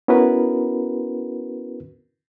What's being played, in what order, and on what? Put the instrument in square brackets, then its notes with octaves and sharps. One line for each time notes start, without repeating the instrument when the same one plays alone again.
[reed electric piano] B3 C#4 E4 F#4 A#4 B4